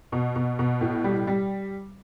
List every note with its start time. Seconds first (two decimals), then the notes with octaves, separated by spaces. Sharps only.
0.12 B2
0.36 B2
0.59 B2
0.81 A2
1.04 G3
1.27 G3